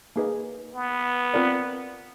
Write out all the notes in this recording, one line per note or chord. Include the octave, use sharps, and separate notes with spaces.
A#3 D#4 G#4 B4 D#5
B3
C4 F4 A#4 D5